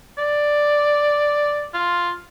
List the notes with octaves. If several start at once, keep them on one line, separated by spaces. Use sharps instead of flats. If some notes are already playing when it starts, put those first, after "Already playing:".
D5
F4